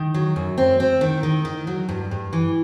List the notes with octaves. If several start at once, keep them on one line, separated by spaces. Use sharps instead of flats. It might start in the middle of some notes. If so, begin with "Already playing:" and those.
Already playing: D#3
F#3
F#2
C4
C4
D#3
D#3
D#3
F#3
G2
G2
E3